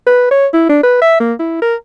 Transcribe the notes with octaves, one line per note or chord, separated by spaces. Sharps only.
B4
C#5
E4
D4
B4
E5
A#3
E4
A#4